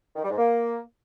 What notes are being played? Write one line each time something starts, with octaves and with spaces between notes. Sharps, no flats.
D#3
G3
G#2
A#3